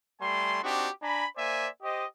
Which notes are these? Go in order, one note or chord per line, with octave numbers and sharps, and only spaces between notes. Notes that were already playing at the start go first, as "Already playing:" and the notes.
G3 A3 G#5 C6
C4 D4 D#4 F#4 G4
D4 G#5 A#5 B5
A#3 C5 D5 E5 G#5
G4 C5 D#5